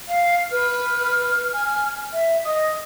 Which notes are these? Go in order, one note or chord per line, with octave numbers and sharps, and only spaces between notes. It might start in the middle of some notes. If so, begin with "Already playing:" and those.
F5
B4 F6
G#5
E5
D#5 D#6